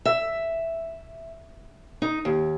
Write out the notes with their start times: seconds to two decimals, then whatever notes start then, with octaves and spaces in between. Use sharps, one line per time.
0.05 E5
2.02 D#4
2.25 D#2